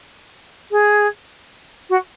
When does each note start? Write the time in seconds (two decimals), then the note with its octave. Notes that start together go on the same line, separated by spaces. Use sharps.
0.71 G#4
1.89 F#4